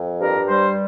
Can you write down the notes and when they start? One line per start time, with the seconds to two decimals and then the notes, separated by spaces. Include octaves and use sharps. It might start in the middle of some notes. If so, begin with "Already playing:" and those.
Already playing: F2
0.21 G2 A#4
0.48 G3 C5